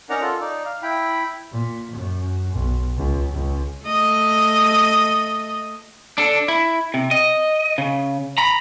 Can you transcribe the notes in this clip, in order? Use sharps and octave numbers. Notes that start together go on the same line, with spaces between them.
C#4 D#4 A#4 D5 F#5 A#5
F4 A4
D#4 D5
F5
E4 G5 B5
A#2
F#2
B1
C#2
C#2
A3 D#5
D4 A4
E4
C3
D#5
C#3
A#5 B5